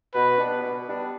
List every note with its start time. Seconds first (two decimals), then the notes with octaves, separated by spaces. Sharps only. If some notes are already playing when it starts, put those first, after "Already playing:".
0.15 B2 B4
0.38 G3 B3 D4
0.62 B2
0.86 G3 B3 D4